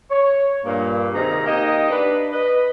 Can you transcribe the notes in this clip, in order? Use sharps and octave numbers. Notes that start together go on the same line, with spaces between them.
C#5
G2 A#2 A#3
C3 D#3 G#4 A#5
A#3 D#4 G4 D#5
D4 B4
B4 D#5